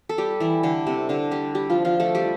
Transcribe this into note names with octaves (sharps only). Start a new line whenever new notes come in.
A4
G3 G4
E3 E4
D3 D4
C3 C4
D3 D4
G3 G4
G3 G4
F3 F4
F3 F4
A3 A4
G3 G4